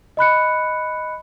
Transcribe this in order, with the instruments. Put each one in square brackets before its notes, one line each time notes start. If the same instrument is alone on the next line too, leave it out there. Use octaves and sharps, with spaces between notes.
[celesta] D#5 B5 F#6 C#7